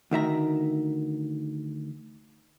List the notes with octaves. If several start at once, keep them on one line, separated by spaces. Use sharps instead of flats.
D2 D#3 E5 A#5